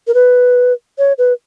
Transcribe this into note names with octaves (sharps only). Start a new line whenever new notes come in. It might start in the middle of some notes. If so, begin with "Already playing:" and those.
A#4
B4
C#5
B4